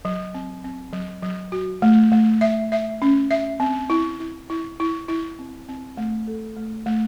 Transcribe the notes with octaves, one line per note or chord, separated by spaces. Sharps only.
F#3
C4
C4
F#3
F#3
F#4
A3
A3
E5
E5
C#4
E5
C4
E4
E4
E4
E4
E4
C4
C4
A3
A4
A3
A3